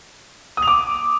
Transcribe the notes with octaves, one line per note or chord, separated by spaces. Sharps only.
D#6
F7
D6